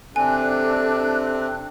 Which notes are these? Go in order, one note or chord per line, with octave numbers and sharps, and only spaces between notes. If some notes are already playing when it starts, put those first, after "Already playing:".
C3 C4 D4 A4 G#5 F#6